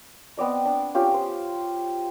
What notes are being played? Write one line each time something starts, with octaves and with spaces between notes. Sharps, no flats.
B3 C4 D5 D#5
D4
C#4 F4 G4
C5